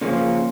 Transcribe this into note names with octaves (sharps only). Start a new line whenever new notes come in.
C#3 F3 A#3 C#4 F4